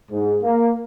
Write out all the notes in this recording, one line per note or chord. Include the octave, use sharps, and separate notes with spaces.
G#2
A#3